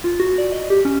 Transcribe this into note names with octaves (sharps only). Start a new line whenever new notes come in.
F4
F#4
D5
D#5
G4
C#4